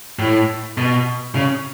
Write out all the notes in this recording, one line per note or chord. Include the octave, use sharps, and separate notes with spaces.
A2
B2
C#3